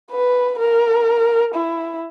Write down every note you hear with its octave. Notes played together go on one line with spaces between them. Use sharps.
B4
A#4
E4